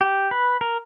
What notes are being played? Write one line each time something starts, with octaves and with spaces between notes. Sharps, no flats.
G4
B4
A#4